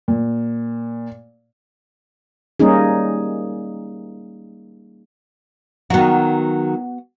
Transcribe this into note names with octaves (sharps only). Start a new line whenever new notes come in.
A#2
G3 A#3 C#4 D#4 G#4
D#3 F#3 B3 F#4